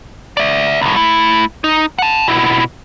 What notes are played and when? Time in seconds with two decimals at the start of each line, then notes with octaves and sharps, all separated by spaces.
0.37 D5 E5
0.81 C2 A2
0.96 A3 E4
1.64 D#4
1.99 F#5 A5
2.28 B2 E4